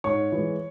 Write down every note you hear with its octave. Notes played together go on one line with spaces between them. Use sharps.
G#2 C#5 C#6
E3 G#3